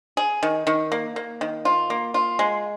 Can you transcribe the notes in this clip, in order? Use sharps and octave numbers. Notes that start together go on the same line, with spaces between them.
G#4
D#3
D#3
A#3
A#3
D#3
F4
A#3
F4
G#3